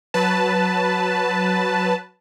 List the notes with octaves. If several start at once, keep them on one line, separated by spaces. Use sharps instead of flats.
F#3 B4 A5